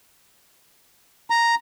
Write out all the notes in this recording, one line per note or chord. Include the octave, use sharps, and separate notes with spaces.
A#5